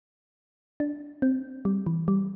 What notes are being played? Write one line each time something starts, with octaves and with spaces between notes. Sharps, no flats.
D4
C4
G3
E3
G3